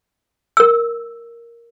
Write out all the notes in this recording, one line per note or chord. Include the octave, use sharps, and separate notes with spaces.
A#4 E6